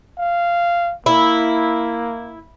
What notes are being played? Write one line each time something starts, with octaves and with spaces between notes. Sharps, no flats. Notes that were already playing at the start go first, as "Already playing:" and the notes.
F5
A#3 E4